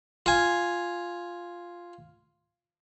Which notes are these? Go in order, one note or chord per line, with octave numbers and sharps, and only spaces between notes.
F4 G#5